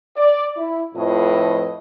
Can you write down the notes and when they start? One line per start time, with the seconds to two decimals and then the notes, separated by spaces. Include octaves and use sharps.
0.16 D5
0.57 E4
0.94 F2 A2 F3 B4 D#5